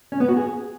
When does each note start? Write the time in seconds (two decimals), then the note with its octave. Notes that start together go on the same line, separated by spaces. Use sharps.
0.12 C#4
0.20 B3
0.29 F#4
0.37 G#4